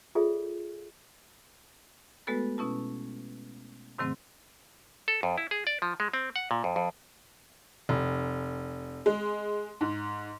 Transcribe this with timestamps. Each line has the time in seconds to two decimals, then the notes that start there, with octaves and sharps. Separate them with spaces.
0.15 F4 G#4 A4 C#5 D5 E5
2.27 G#3 A3 B3 F#4 A4 B4
2.58 B2 C#4 E4 A5
3.98 G#2 C3 D#3 F#3 A3 C4
5.08 A4
5.23 F2
5.38 E4
5.51 G#4
5.67 D5
5.82 F3
6.00 G#3
6.13 C4
6.36 F#5
6.51 A#2
6.64 F2
6.76 F2
7.89 F1
9.06 G#3
9.81 G#2